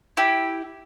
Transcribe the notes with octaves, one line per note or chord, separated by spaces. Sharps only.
E4 G4